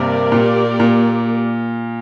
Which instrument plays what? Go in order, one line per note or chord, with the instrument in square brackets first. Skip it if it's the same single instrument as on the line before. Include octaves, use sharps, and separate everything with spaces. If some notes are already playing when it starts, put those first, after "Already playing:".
Already playing: [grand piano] G2 C3 [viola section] A#3 G4 A#4 D5
[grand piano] A#2
A#2